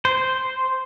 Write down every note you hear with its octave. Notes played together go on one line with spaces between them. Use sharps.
C5